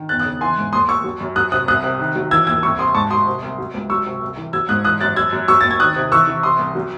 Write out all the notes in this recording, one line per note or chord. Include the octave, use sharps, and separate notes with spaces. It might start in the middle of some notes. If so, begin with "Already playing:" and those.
Already playing: D#3
E2 F#6 A6
D#6 F#6
C#3
E3 G#5 C6
G#2
D#2 C6 D#6
D#2 C#6 E6
F#3
F#2
F#3 D#6 F#6
C3 D#6 F#6
C2 D#6 F#6
C3
D#3
F#3
E3 E6 G#6
D#2 E6 G#6
C2 C#6 E6
C3 C6 D#6
G#2 A5 C#6
F#3 C6 D#6
C3
C2
F#3
C#2
F#3 C#6 E6
C3
C2
E3
F#3 E6 G#6
G#2 D#6 F#6
E3 D#6 F#6
F#2 F#6 A6
F#2 E6 G#6
F#2
F#3 C#6 E6
D#2 A6
G#6
D#3 D#6 F#6
C3
E3 C#6 E6
E3
C3 C6 D#6
C2
F#3